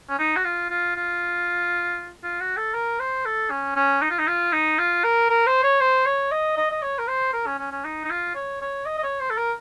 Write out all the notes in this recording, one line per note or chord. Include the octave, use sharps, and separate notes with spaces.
C#4
D#4
F#4
F4
F4
F4
F4
F#4
A4
A#4
C5
A4
C#4
C#4
D#4
F4
D#4
F4
D#4
F4
A#4
A#4
C5
C#5
C5
C#5
D#5
D#5
D#5
C#5
A#4
C5
A#4
C#4
C#4
C#4
D#4
D#4
F4
C#5
C#5
D#5
D#5
C#5
C5
A4
A#4